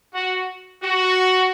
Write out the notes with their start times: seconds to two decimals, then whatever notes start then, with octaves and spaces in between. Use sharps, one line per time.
0.14 F#4
0.83 F#4